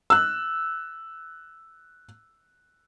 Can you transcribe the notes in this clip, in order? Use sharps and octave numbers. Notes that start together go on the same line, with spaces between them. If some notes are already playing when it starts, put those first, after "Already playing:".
E6 F#6